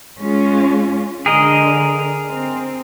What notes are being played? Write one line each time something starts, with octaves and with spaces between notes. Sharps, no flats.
G#3 C#4 F4
D3 G#4 A#4 D#5
C4